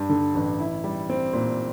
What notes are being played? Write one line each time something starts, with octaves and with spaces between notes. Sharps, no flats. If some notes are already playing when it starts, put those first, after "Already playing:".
Already playing: G2 G3
D3
A1
E4
G3
C4
A#2